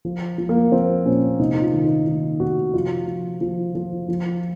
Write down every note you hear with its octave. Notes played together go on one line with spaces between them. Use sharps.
F3
F3
A#3
F3 C4
A#2 C#4
C3 D#4
D#4
F4
D#3
D#4
D#3 D#4
C3 F#4
F3 F4
F3
F3
F3
F3